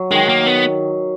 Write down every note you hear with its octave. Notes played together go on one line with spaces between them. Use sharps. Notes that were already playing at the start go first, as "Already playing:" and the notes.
Already playing: F#3
D#3 G#3
A#3
B3